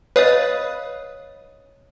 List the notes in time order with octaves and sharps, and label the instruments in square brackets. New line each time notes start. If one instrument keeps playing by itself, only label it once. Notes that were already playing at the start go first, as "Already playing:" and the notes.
[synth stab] B4 F5 D#6 [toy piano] C#5 D#5